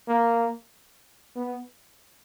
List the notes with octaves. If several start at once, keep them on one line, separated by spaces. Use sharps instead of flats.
A#3
B3